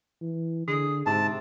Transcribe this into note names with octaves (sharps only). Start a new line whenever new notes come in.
E3
D3 G#4
G#2 C3 A5